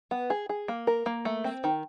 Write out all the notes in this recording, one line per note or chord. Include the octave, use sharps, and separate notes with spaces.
B3
G#4
G#4
A#3
A#4
A#3
A3
C4
D#3